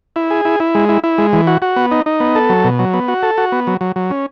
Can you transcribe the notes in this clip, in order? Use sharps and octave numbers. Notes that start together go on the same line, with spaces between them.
E4
G#4
E4
E4
G#3
E4
E4
G#3
E3
F#4
F#4
B3
D#4
D#4
B3
A4
F#3
B2
F#3
B3
F#4
A4
F#4
B3
F#3
F#3
F#3
C#4